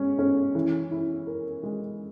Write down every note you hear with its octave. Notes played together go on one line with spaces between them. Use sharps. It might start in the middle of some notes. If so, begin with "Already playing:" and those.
Already playing: G#3 C#4
C#4
E3
E4
A#4
G#3